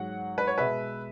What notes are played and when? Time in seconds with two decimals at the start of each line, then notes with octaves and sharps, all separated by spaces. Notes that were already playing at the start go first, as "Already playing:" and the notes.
Already playing: G#2 F#3 F#5
0.38 B4
0.47 C#5
0.58 B2 G#3 B4 E5